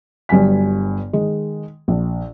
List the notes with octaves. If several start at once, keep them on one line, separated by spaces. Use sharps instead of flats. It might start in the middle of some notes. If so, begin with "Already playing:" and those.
G1 G2 F#3 G#5 B6
D#3 G#3
A#1